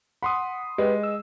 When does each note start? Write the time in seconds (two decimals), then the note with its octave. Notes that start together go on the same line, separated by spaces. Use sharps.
0.23 F#5 B5 C6 D#6
0.78 G#3 G4 B4
1.03 E6